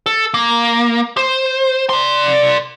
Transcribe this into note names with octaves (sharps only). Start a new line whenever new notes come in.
A4
A#3
C5
D5 C6